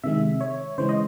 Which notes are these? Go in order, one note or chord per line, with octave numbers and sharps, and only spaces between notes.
C3 D#3 G#3 E5
C#5
C#3 E3 G#3 C5
D#5